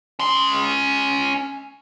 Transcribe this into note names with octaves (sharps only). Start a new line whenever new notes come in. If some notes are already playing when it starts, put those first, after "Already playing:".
C#4 C6